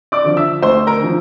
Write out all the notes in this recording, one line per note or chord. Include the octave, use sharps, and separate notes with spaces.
D5 D6
D3 F3
E5 E6
D2 C5 C6
A#4 A#5
D3 F3